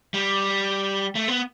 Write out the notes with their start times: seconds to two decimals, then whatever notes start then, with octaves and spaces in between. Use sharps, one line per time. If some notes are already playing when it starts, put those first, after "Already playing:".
0.14 G3
1.15 A3
1.28 B3